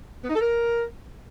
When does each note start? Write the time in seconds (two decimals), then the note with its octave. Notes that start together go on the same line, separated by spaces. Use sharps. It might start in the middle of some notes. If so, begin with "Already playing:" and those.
0.24 B3
0.30 D#4
0.35 A4
0.41 A#4